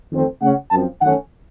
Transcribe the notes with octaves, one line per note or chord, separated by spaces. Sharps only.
F2 D#3 A3 C4
C#3 A3 C#4 F#5
F#2 F3 C4 A5
F#2 D#3 A3 C#4 F#5